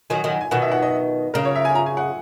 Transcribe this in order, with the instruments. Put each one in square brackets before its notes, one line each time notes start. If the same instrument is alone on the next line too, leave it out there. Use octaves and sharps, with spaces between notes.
[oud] D#3 F#3 [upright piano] G#5
[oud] D#3 F#3
[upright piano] G#5
G#5
[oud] B2 D#3 [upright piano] F#5
[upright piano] E5
F#5
D#5
[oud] C#3 [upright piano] A#4
[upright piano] C#5
E5
G#5
A#5
G#5
F#5